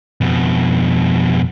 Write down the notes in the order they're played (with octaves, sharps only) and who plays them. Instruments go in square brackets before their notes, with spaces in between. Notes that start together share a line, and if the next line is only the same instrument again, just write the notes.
[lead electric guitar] F2 B2